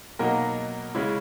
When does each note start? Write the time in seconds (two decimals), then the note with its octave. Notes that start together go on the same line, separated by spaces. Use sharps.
0.19 B2 F#3 A#3 D#4 A#4
0.95 C#3 G#3 C#4 E4